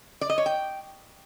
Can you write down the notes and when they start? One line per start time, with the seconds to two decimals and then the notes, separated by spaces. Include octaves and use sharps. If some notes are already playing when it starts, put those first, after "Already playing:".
0.21 D5
0.30 D#5
0.38 C#5
0.46 G5